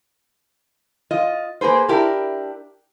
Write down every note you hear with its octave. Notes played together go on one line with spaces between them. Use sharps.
F4 D#5
A#3 G#4 B4 C5
D4 E4 G4 A#4